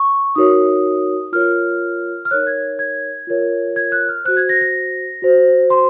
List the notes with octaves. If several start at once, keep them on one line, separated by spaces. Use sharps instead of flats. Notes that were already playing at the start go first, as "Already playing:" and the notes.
Already playing: C#6
D#4 F#4 A#4 C#5 D#6
F4 A#4 C#5 F6
F6
D#4 A#4 C#5 F#6
G#6
G#6
F4 A#4 C#5
G#6
F#6
F6
F#4 C5 F#6
G#6
A#6
A#6
F#4 C5
C6